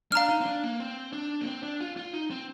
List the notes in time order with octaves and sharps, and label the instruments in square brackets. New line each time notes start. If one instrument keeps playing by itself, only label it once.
[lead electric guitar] D4 [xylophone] F5 A#5 F6
[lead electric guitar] D#4
C4
D4
A#3
C4
D4
A#3
C4
D4
F4
F4
D#4
C4